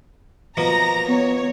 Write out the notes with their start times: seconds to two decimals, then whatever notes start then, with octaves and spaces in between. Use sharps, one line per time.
0.57 B2 F3 A#3 A#5 A#6
1.08 B3 C#5